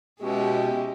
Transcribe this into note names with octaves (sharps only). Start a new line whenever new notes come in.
B2 G#3 C#4 E4 G4